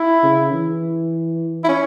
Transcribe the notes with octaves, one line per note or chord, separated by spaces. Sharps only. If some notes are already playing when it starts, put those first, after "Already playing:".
Already playing: E4
C#3
E3
E4
C#4